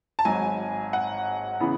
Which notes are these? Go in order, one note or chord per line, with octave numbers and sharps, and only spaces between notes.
A5
G#1 G#2 F#3 G#5
F#5
C#3 E3 B3